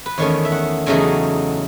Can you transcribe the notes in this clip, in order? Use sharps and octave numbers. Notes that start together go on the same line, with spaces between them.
B4
E2 D#3 A3 C#4 C#5
E5
F#5
E2 C#3 F#3 A3 D#4 G#5